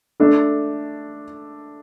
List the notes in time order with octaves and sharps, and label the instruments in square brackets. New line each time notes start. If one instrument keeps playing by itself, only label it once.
[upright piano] A3 D4 A4